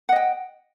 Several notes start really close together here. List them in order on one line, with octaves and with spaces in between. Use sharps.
F#5 D#5 G5